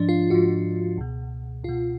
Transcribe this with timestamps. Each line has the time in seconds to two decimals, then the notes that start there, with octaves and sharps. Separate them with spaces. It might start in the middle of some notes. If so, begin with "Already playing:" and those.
Already playing: G#2 F3 D4
0.09 F4
0.30 G#2 F3 F#4
0.97 C#2 B2
1.64 C#2 F4
1.69 B2